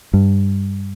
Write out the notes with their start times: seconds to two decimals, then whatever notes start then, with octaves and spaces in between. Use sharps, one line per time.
0.13 G2